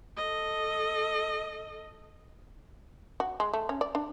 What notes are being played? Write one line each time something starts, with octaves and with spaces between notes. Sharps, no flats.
A4 D#5
F#4
G#3
A3
C#4
D5
D4